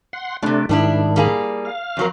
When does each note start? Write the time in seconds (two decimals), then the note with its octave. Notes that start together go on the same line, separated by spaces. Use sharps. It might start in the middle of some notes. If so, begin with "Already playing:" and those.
0.13 F#5 C6
0.43 A2 C3 A3 D4
0.69 G#2 D#3 G3 D4 E4
1.16 G3 A#3 G#4
1.65 F5
1.97 F2 F#3 A#4